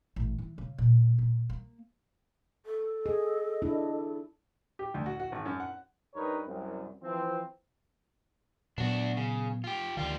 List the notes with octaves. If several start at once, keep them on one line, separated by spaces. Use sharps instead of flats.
A1
E3
C#3
A#2
A#2
A#3
A4
G#4 D#5
D4 E4
G4
D2
F#4
F#4
G#1
F#2
F#5
G2 G3 D#4 A#4 B4 C#5
C2 F#2
E3 F3 C4
A#2 F#3 B3 D4 F#4
C#3
F4 G4
D2 D#3 G3 F4